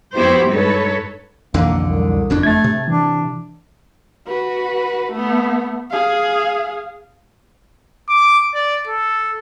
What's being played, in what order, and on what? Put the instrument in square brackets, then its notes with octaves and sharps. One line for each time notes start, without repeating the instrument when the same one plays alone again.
[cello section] F2 B3 E4 F#4 G4 C5
G2 G#3 D#4 A4 B4 C#5
[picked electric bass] B1 F2 D3 [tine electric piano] E3 [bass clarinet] A#3
[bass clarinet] C2
[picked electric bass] F#1 F2 D4
[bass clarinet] A3 [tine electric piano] G#6 A6
[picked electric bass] C3
[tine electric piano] E3 [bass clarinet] D4
[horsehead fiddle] F#4 B4
A3 B3
G#4 F5
[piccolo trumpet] D6
D5
A4